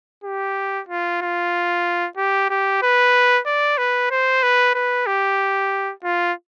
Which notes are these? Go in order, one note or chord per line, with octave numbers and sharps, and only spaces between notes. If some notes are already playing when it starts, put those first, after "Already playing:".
G4
F4
F4
G4
G4
B4
D5
B4
C5
B4
B4
G4
F4